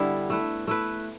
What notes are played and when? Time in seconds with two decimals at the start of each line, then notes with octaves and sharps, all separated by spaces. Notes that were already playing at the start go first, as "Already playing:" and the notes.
Already playing: D3 G3 B3 E4
0.30 A3 E4 B4
0.67 A3 E4 B4